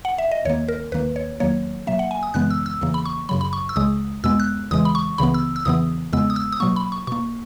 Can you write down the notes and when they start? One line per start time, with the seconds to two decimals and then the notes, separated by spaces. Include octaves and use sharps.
0.05 F#5
0.18 E5
0.31 D#5
0.45 D#2 D#3 A#3 C#5
0.68 A#4
0.92 D#2 D#3 A#3 B4
1.16 C#5
1.40 E2 D#3 F#3 A#3 C#5
1.87 B2 F#3 A#3 E5
1.99 F#5
2.11 G#5
2.23 D#6
2.34 F#2 C#3 E3 G#3 B3 F#6
2.50 E6
2.66 E6
2.81 E2 C#3 E3 A#3
2.94 B5
3.05 C#6
3.29 F#2 C#3 F#3 B5
3.41 B5
3.53 C#6
3.69 E6
3.76 C#2 C#3 G#3 D#6
4.24 E2 B2 G#3 B3 E6
4.40 F#6
4.71 E2 C#3 E3 G#3 D#6
4.85 B5
4.95 C#6
5.18 C#2 C#3 E3 B3 B5
5.34 E6
5.56 E6
5.65 E2 C#3 E3 B3 D#6
6.13 E2 C#3 G#3 B3 E6
6.30 D#6
6.36 E6
6.52 D#6
6.60 B2 F#3 A#3 C#6
6.76 B5
6.92 C#6
7.07 B2 A#3 C#6